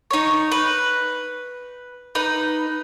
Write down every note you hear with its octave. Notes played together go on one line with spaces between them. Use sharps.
D#4 C#5
B4
D#4 B4